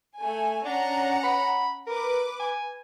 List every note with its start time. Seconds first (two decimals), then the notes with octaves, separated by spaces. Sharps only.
0.18 A3 G#5
0.65 C#4 D4 F#5 A#5
1.24 B5
1.87 A#4 B4 D6
2.40 G#5